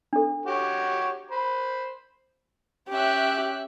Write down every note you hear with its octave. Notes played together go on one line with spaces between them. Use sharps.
D4 A4
F#4 G4 C#5
C5 B5
C#4 G4 E5 F#6